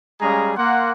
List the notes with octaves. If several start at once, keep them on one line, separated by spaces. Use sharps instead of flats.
G3 G#3 C#4 G#4 F5 A#5
A#3 F#5 C6